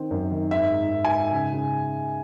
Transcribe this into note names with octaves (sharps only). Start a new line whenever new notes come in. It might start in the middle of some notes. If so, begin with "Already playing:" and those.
Already playing: D#3 C4
F#2
D#3
G#2 E5
G#2
G#2
G#5
G#2
C#3
C#3